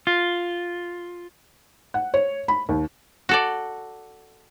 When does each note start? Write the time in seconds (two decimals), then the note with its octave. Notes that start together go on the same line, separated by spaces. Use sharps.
0.07 F4
1.94 F#5
2.14 C#5
2.48 B5
2.69 D#2
3.29 F#4 A4 D5